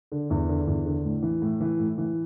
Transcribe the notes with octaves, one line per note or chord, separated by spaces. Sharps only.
D3
E2
D3
E2
D3
A2
E3
A2
E3
A2
E3